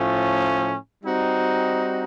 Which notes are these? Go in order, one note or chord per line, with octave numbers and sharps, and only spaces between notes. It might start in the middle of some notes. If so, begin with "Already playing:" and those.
Already playing: A2 F3 A3 C#4
G3 C4 D#4 F#4